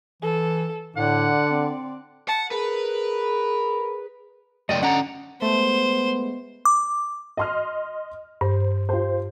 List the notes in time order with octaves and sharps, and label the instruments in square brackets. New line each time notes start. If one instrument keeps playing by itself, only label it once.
[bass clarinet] E3 [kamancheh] A4
[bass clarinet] A2 [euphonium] D3 [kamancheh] D5 [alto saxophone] F#5
[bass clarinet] C4
[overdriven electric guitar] F#5 [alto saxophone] A5
[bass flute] G#4 [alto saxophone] A#4 [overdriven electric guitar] B4
[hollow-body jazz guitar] C#2 D5 D#5 [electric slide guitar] F#2 A3 G5
[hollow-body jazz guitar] D3 F#5 [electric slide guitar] C#4 D5 A#5
[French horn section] G#3 B3 [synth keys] A3 [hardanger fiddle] C5
[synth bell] D6
[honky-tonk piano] D#5 C6 F6
[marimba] G2 [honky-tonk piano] C5
[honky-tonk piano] F4 G4 C5